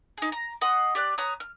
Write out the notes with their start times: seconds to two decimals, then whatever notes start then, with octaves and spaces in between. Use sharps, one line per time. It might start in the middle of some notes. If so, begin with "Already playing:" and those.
0.18 D#4 G#4
0.32 A#5
0.61 D#5 F#5 C6 D#6
0.95 G4 D5 F6 F#6
1.18 B4 C#5 A#5 D#6
1.40 F6